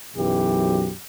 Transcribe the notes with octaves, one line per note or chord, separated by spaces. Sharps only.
B1 F#2 E3 G4